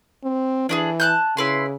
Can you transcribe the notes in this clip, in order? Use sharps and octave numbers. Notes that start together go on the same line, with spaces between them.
C4
E3 D4 G4 G#4
A5 F#6 G6
C#3 E4 B4 C6